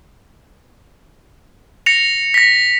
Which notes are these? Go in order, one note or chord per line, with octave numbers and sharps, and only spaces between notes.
A#6 C#7 F7
A#6 B6